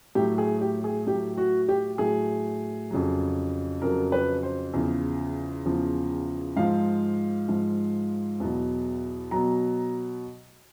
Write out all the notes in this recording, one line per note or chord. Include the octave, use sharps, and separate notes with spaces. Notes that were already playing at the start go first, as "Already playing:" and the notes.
A2 F#3 G4
G#4
G4
G#4
A2 F#3 G4
F#4
G4
A2 F#3 G#4
F2 C#3 F#3
F2 C#3 F#3 A#4
B4
C5
E2 C#3 F3
E2 C#3 F3
G#2 F3 F5
G#2 F3
E2 B2 F#3
B2 F#3 A#5